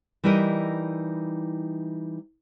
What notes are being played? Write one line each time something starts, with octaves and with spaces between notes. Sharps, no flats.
E3 G3 D#4 E4 A#4 D#5